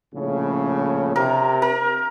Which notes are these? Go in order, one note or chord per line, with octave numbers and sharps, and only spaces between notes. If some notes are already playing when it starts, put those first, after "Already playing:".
A#1 A2 C#3
C3 A#4
A#4